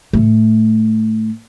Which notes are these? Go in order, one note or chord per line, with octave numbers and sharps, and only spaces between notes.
A2 A3